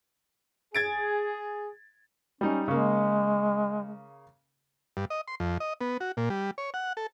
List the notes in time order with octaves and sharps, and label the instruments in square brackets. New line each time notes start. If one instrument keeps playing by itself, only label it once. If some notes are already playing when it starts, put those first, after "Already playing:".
[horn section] G#4 [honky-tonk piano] G#6 A6 D7
[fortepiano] G3 D#4 [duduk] C#4
[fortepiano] C#3 A#3 [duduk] G#3
[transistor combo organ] G2
D#5
C6
F2
D#5
B3
F#4
A#2
G3
C#5
F#5
A4